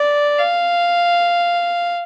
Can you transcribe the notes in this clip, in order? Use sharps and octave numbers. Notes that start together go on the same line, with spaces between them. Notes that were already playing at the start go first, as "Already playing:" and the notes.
Already playing: D5
F5